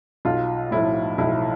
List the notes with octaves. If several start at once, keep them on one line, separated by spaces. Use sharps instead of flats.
B1 F4
A2 F3 E4
B1 E4